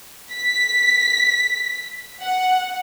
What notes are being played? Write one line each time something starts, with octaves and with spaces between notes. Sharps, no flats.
B6
F#5